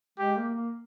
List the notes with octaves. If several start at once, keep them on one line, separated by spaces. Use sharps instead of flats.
G#3 G4
A#3
A#3